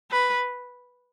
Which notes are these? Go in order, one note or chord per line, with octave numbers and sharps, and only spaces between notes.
B4